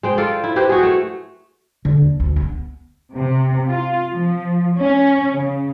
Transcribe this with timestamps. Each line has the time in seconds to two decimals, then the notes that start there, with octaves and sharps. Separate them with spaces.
0.03 G#3 C5 G5
0.17 F4 A4 A#4 D5
0.44 E4
0.56 E4 G4 B4 C5
0.69 F#4 G#4
0.83 A3
1.85 D3
2.01 D#2
2.20 D2
2.36 B3
3.15 C3
3.67 F4
4.13 F3
4.78 C#4
5.33 C#3